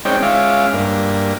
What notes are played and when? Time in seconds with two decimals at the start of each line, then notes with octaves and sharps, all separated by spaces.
0.05 G#3 C4 C#4 D#4 D5 G5
0.23 G#3 C#4 F4 E5 F5 D6
0.73 G2 A#3 D4